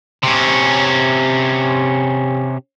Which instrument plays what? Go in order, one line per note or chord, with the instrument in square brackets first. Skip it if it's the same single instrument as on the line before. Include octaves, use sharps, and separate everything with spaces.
[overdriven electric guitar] C3 C#4